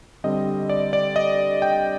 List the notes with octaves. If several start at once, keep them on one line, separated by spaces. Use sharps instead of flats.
D3 G3 C4 D#5
D5
D5
D#5
G5